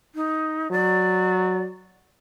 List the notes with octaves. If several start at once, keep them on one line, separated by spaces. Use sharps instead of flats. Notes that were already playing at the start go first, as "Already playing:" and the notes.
D#4
F#3 D5